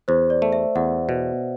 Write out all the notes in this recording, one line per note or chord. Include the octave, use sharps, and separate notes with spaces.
E2 C5
D5
A3
E5
E2 F#5
B2